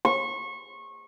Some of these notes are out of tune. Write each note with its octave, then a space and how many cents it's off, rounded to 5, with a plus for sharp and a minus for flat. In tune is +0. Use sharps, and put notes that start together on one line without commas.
C#6 -25